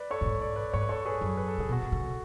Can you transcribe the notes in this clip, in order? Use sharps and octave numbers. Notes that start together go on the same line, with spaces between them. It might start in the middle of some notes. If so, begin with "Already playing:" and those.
Already playing: B4 D5
A4 C#5
F#2
G#2
D5
B4 D5
G#2 C#5
B4
A4 C#5
G#4 B4
F#2
B4
A4
C#3 G#4
B2 F#4 A4
B2
C#3